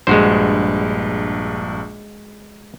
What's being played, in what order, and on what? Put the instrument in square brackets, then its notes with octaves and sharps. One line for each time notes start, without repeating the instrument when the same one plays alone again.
[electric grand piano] A#1 G2 [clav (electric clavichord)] G#3 F#4 C5